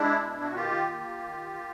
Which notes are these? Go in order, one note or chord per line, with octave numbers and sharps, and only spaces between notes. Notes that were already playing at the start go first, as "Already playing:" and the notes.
Already playing: G#3 D4 E4
B2
F#4
D#3 F4 G4
A#3
D#3
A#3